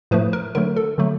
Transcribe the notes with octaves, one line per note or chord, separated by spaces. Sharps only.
A2 F3 A3 B4
A#4
D3 F#3 A3 A#4
A4
D3 F#3 A3